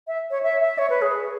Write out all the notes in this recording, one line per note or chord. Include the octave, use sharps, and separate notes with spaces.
E5
C#5
E5
E5
C#5
B4
G#4